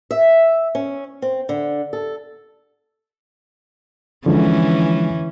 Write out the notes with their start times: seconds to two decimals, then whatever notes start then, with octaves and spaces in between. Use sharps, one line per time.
0.11 E5
0.75 C#4
1.22 C4
1.49 D3
1.93 A4
4.26 D3 E3 F3 G#3 C#4